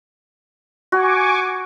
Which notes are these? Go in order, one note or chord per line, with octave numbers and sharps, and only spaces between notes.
F#4 G#5 C#6 D6